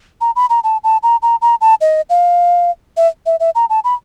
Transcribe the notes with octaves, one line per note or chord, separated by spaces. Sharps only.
A#5
B5
A#5
A5
A5
A#5
A#5
A#5
A5
D#5
F5
E5
E5
E5
A#5
A5
B5